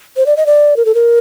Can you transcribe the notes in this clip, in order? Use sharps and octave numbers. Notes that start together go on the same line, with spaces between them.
C5
D5
D#5
D5
A#4
A4
A#4